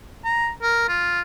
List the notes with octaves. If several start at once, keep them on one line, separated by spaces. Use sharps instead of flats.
A#5
A#4
F4